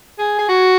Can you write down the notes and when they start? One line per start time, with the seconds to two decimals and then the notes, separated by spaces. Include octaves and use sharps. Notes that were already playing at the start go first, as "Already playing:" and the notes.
0.18 G#4
0.39 G#4
0.49 F#4